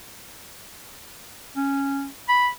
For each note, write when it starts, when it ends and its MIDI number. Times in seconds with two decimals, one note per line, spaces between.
1.56 2.06 61
2.29 2.49 83